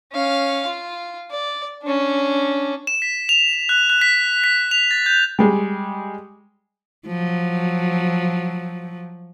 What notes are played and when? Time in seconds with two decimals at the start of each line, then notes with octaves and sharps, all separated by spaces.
0.13 C#4 F5
0.67 F4
1.30 D5
1.83 C#4 D4
2.87 E7
3.02 B6
3.29 F7
3.69 F#6
3.90 F#6
4.01 B6
4.44 B6
4.71 F7
4.91 A6
5.06 G6
5.39 G3 G#3
7.07 F3 F#3